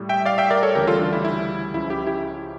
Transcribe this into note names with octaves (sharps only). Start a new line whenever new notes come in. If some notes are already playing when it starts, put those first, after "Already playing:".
Already playing: A2 G3
E5 G5
D5 F5
E5 G5
A#4 D5
A4 C#5
D2 C#3 E3 G3 G4 A#4
F4 A4
D4 F4
E4
E4
C#2 C#3 F3 E4
E4 G4
E4 G4